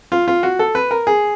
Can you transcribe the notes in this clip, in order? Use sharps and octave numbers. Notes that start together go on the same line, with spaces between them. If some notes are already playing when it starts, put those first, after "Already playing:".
F4
F4
F#4
A4
B4
A#4
G#4